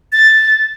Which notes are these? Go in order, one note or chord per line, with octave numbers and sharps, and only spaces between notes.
A6